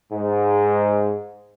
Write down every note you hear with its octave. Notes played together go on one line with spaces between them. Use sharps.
G#2